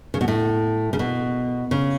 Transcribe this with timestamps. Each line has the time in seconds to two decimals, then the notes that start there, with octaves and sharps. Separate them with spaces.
0.14 C#3
0.21 B2
0.28 A2
0.93 C#3
0.99 B2
1.71 C#3